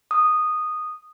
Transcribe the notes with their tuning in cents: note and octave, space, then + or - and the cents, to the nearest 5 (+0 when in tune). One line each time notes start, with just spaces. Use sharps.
D#6 -10